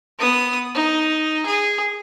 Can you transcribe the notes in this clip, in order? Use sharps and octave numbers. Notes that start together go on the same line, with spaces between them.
B3 D#6
D#4
G#4